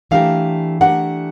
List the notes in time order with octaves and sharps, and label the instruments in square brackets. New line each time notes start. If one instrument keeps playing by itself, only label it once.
[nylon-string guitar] E3 A3 D4 G4 A#4 [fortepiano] F5
[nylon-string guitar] E3 A3 D4 G4 A#4 [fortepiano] F#5